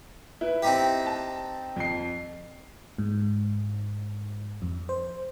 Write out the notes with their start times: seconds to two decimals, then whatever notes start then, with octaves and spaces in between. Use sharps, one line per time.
0.41 E4 B4
0.62 C4 D#4 G4
1.06 A5
1.76 F2 C7
2.98 G#2
4.62 F2
4.89 C5